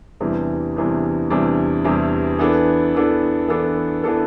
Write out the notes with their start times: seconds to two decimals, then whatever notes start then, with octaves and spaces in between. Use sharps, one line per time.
0.20 E2 C3 E3 G3 D4
0.76 E2 C3 E3 G3 D4
1.30 E2 C3 E3 G3 D4
1.84 E2 C3 E3 G3 D4
2.39 E3 B3 D4 A4
2.94 E3 B3 D4 A4
3.48 E3 B3 D4 A4
4.04 E3 B3 D4 A4